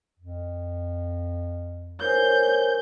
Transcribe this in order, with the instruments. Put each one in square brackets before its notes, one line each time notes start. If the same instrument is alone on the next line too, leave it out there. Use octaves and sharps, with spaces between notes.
[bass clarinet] F2
[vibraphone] A#4 C5 G#5 [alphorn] C#5 [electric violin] G6